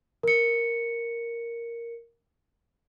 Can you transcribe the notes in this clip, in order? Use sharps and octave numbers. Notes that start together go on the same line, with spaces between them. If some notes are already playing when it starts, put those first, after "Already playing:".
A#4 C#7